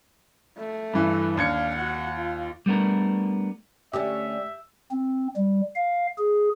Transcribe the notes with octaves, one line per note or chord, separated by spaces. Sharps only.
A3
G2 E3
D#2 D4 F5 G#6 C#7
F#4 F#5
F4
G3 A3 B3 D4 A#4
D3 A3 C#4 G4 D5 E5
C4
G3
F5
G#4